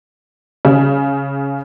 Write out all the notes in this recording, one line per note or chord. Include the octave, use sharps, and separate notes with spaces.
C#3